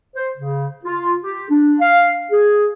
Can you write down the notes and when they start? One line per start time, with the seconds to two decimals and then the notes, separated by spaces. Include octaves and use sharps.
0.16 C5
0.37 C#3
0.85 F4
1.24 G4
1.48 D4
1.80 F5
2.31 G#4